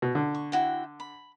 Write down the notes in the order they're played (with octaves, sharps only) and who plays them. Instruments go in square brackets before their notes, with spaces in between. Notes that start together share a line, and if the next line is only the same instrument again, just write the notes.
[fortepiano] B2
D3
[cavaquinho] C#6
E4 F#4 G5
B5